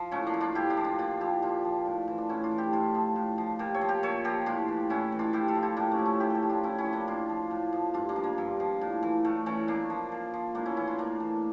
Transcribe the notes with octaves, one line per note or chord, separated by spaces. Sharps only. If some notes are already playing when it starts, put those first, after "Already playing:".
Already playing: F3
A2 A3 C#4
A#3 D4
F3
D4 F4
A2 E4 G4
D4 F4
F3
D4 F4
A#2 D4 F4
F3 E4 G4
A#2 D4 F4
F3
A2
E3
D4
A2 C#4 E4
D4 F4
E3
E4 G4
A2 F4 A4
F3
A2
F3
A#2 G4 A#4
A4 C#5
F3
G4 A#4
A#2 A4 C#5
F3 G4 A#4
A2 D4 F4
E3
A2 C#4 E4
E3
D4 F4
A2 E4 G4
F4 A4
F3
E4 G4
A2 A#3 D4
A3 C#4
F3
C#4 E4
A2 E4 G4
G4 A4 A#4
F3
D4 F4
A2 C#4 E4
C#4 E4
F3
A#3 D4
A2 D4 F4
F3
A2
F3
G2 D4 F4
A#3 D4
F3
A#3
G2
F3
A2
E3
A2 A3
E3 A3 C#4
A#2 A#3 D4
F3
A#2
F3
A2 A#3 D4
C#4 E4
E3 C#4 E4
D4 F4
A2 A#3 D4
E3